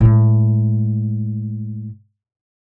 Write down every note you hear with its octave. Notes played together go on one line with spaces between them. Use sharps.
A2 G#3